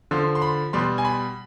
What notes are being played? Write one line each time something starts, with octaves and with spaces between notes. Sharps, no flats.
D3 F3 C6
C6
B5
B2 G3 C6
G#5
B5